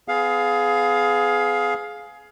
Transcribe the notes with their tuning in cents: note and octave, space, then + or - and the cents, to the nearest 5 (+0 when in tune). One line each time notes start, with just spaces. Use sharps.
B3 +40 G#4 +15 F5 +10